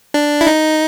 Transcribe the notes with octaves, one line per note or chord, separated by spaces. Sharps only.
D4
E4
D#4